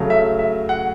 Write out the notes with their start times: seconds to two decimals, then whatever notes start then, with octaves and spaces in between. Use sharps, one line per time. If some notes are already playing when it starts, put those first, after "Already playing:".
Already playing: C#3 F#3 A3
0.10 E5
0.39 E5
0.69 F#5